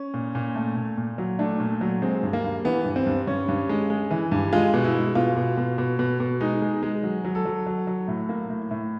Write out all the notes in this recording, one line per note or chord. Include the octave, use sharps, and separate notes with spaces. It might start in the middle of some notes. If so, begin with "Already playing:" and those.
Already playing: C#4
A#2
A#2
A3
A#2
A#2
F#3
A3 D4
A#2
F#3
G#3 C4
G2
A#3
G2
E3 B3
G2
C4
G2
G2 C#4
G2
G#3
G#3
E3
G2
G#3 F4
B2
E4
G#3
B2 F4
B2
B2
B2
B2
B2
G#3 D#4
G#3
G#3
F#3
F#3
A4
F#3
F#3
F#3
A2
A#3
A2
A2